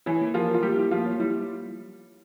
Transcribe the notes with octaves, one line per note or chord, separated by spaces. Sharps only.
E3 E4 C#5
A#3
F3 F4 A#4
A#4
F4
G3 A#3 G4
E4
F3 A#3 F4
C#5
G3 E4